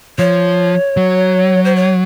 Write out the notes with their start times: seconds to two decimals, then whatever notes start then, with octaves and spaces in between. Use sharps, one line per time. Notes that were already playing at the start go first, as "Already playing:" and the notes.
0.18 F3 C#5
0.97 F#3
1.65 C5
1.76 C#5